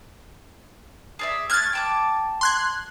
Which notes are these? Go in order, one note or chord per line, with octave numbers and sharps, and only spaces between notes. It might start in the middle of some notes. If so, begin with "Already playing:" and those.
G#4 D5 E5
A3 F6 F#6 G#6 A6
G5 A5 D6
C6 F#6 G#6